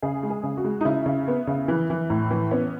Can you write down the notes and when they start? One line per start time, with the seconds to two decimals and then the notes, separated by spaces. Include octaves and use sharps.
0.02 C#3 G#4
0.23 G#3
0.30 G#4
0.43 C#3
0.57 F#4
0.64 G#3
0.81 D#4
0.85 C#3 E4
1.06 C#3
1.28 B3
1.47 C#3
1.68 E3
1.90 E3
2.10 A2
2.31 E3
2.51 B3 C#4